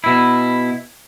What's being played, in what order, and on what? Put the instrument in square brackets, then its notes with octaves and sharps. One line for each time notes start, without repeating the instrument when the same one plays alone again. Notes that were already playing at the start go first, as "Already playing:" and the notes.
[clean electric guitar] B2 E4